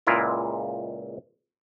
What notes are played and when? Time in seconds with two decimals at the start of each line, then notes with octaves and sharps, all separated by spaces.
0.07 C#2 A#2 G#3 E4 F4 A#4